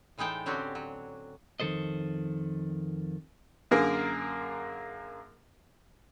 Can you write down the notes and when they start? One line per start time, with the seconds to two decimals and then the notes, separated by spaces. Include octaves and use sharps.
0.18 A2 E3 G#3 D#4 G5 A5
0.46 D3 F#3 C4 C#4 F#4 G4
0.75 F#3
1.60 F2 D#3 E3 A4 C5 D#5
3.71 F#2 D3 A#3 G#4 A#4